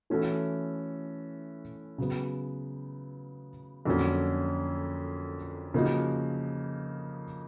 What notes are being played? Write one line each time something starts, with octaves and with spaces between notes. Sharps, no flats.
E3 A3 C#4 F#4 A4
C#3 F#3 B3
F2 D3 F#3 A#3 C#4
C#3 F3 A#3 D#4 F#4